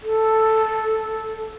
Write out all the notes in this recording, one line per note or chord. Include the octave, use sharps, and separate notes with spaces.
A4